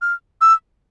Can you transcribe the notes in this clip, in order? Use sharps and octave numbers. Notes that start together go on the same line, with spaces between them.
F6
E6